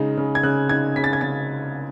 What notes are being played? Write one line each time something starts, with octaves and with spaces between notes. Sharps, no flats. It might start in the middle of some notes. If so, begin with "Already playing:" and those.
Already playing: C#3 G#3 D#4
C#3
G#6
C#3 F#6
D#4 G#6
C#3 B6
A6
G#6
C#3 A6